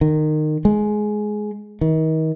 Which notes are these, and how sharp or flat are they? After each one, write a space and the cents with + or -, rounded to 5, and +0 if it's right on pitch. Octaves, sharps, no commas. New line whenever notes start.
D#3 -20
G#3 +15
D#3 +35